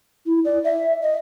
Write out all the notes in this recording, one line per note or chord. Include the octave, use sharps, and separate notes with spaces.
E4
D5
E5
D#5